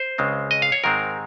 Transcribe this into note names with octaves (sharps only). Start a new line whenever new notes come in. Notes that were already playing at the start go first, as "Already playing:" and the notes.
Already playing: C5
C#2 C#3 G#3 C4
D#5
F5
C#5
G#2 D#3 G#3 C4 A#4